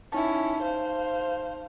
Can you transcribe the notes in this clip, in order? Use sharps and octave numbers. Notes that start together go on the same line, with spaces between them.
C#4 D#4 E4 A5
C5 F5